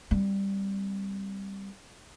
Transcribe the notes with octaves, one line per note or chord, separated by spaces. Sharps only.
G3 C4